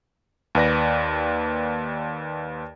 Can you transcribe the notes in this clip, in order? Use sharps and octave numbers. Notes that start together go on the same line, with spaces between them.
D#2 B4 D5 A#6